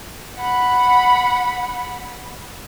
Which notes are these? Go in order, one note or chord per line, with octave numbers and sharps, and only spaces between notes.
F#5 B5